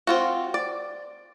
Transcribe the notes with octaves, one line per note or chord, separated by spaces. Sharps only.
C4 F4 F#4
D5